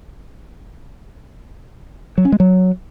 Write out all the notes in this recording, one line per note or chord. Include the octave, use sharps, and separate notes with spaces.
F#3
C#4
G#3
F#3